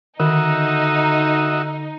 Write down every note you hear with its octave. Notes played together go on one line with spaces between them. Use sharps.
D3 D#3 D#4 F#4 D#5 E5